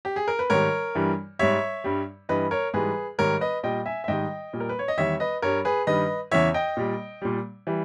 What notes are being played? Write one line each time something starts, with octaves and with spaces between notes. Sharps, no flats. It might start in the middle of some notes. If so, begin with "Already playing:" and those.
G4
G#4
A#4
B4
G#2 D#3 G3 A#4 C#5
G2 E3 G3
G#2 G3 C#5 E5
G2 G3
G2 E3 G3 B4 D#5
A#4 C#5
G#2 E3 G3 G#4 B4
G#2 D#3 G3 A#4 C#5
B4 D#5
A#2 G3 D#5 G5
E5 G#5
E5
G#2 D#3 G3 D#5 G5
A#2 G3
A#4
B4
C#5
D#5
E2 D#3 G3 C#5 E5
B4 D#5
G2 G3 A#4 C#5
G#4 B4
G2 D#3 G3 B4 D#5
E2 C#3 E3 C#5 E5
D#5 G5
A#2 G3
A#2 G3
E3 G3